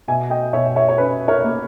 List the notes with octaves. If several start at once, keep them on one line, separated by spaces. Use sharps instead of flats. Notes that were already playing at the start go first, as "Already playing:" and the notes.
B2 E5 G#5
D#5 G5
B2 C#5 E5
C#5 E5
C#5
C#4 B4
A#4 C#5
A#3